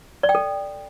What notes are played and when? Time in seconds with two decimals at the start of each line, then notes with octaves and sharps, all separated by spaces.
0.23 D5
0.29 G5
0.35 A4